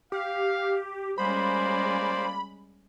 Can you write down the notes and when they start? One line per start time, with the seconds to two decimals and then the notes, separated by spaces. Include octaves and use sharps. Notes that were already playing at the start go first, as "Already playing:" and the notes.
0.12 G4 F5
1.18 G3 G#3 A#3 C#4 F4 C5 D5 B5